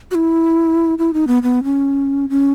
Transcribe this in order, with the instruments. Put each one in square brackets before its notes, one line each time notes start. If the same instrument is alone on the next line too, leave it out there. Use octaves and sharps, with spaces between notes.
[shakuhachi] F#4
E4
E4
D#4
B3
B3
C#4
C#4